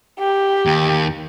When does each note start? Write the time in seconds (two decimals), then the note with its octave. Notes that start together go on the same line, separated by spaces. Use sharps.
0.19 G4
0.66 D#2